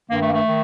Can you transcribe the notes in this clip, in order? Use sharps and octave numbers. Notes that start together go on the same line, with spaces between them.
G2 D#3 A#3
A3
A#3
A3
D#3